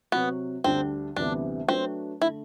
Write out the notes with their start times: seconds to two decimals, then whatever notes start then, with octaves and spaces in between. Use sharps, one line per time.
0.12 C3 F#3 B3 C4 F#4
0.64 D2 D3 G3 C4 D4
1.16 D2 C3 E3 G3 B3 D4
1.68 F#3 A3 C4 D4 F#4 B4
2.22 D3 A3 E4